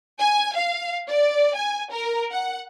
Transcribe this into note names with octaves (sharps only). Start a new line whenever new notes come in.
G#5
F5
D5
G#5
A#4
F#5